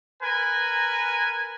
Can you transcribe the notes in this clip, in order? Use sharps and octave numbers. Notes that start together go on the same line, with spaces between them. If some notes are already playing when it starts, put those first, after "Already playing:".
A#4 B4 G#5